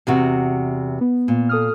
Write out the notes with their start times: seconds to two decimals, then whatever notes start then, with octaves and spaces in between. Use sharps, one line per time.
0.07 E2 C3 F#4
1.01 B3
1.28 A#2
1.49 A4 D#6 F6